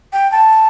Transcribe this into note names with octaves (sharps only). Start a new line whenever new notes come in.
G5
A5